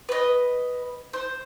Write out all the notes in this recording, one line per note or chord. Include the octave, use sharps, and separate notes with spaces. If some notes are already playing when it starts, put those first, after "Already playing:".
B4 D#5
C5